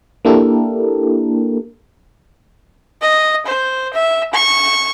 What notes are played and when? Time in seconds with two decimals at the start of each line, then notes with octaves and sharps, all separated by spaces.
0.25 A#3 D4 E4 G4 A4 A#4
3.02 D#5
3.46 C5
3.94 E5
4.33 C#6